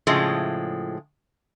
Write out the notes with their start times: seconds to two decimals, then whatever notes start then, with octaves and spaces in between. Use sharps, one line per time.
0.07 A2 C#3 F3 G#3